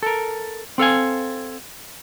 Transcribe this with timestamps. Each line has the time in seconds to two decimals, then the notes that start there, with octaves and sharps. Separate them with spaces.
0.03 A4 A#4
0.78 C4 A4 F5 G#5